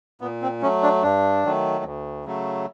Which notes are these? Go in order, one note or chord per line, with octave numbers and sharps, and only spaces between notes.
A#2 B3
C4
F#3 A3 C#4
D4
G2 D4
D#3 F#3 A3
D2
C#3 F#3 A3